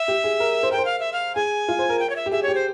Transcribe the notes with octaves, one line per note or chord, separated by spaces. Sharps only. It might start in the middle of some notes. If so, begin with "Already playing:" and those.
Already playing: E5
G4
G#4
A#4
C5
A#4 G5
C5
F5
E5
F5
G#4 G#5
F4
C5
A#4
G5
C#5
E5
G4
G#4 E5
C#5
G4
C5